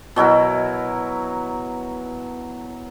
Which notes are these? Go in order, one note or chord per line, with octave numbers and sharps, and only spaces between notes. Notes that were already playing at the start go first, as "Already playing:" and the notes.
B2 F#3 E4 A#4